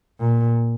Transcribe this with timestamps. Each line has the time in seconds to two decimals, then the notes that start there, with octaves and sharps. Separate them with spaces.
0.20 A#2